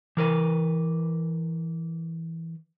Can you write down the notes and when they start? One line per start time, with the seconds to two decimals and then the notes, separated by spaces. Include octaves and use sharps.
0.17 E3 A#4 B4